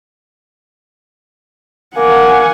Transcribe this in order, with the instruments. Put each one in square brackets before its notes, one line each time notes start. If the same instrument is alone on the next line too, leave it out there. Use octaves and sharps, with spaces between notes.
[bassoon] A#3 [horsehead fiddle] F#5 G#5